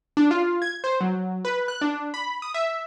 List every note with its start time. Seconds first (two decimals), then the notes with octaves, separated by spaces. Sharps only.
0.17 D4
0.31 F4
0.62 G#6
0.84 C5
1.01 F#3
1.45 B4
1.68 F#6
1.81 D4
2.14 B5
2.42 D#6
2.54 E5